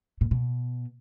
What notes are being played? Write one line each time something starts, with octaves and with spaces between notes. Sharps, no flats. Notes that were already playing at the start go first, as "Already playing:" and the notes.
A#2
B2